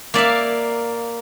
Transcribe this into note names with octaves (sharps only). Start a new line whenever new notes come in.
A#3 D5 E5 F5